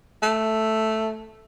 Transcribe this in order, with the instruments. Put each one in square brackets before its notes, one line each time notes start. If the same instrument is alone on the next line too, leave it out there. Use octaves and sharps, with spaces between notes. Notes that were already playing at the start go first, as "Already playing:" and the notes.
[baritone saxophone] A3